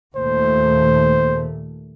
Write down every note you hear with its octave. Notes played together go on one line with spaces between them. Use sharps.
D#2 A#2 A3 C5